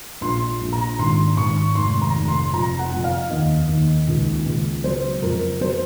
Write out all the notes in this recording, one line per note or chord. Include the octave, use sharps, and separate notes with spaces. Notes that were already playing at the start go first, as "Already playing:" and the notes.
A#1 C6
A#1
A#5
G#1 C6
G#1 C#6
F1 C6
A#5
F1
C6
F2 A#5
F#5
F2
F5
D#2 D#5
D#2
C#2
C#2
F#3 C5
F2 A#4
F#3 C5